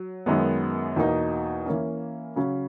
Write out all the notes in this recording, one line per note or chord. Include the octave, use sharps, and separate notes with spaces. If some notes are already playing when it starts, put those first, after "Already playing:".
Already playing: F#3
F#2 D#3 G#3 B3
E2 B2 A#3 D#4
E3 A#3 C#4
C#3 F#3 C#4